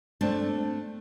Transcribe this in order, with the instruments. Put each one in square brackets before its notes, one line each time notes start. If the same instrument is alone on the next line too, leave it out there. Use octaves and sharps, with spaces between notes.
[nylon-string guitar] A3 C4 D4 A4